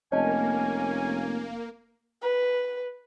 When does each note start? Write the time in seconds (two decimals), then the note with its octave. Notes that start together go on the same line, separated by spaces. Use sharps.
0.12 F1 A#3 C#4 C#5 D#5 G#5 A5
2.22 B4